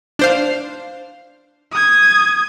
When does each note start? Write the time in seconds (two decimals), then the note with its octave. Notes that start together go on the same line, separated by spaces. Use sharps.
0.19 D4 C5 F5
1.73 D#6 G#6